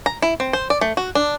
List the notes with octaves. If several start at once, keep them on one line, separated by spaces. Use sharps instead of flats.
A#5
E4
C4
C5
D5
A3
F#4
D4